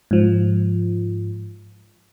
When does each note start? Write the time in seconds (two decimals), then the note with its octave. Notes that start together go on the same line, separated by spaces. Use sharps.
0.11 G#2 F3